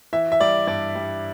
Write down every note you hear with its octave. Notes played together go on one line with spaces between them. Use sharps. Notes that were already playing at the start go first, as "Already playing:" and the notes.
E3 E5
E5
G3 D5
G2 D5
G3